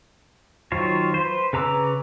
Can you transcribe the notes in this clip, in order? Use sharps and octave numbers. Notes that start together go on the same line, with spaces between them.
D#3 F#3 F4 C5 C#5
B4 C5
C#3 B4 A#5 D6 E6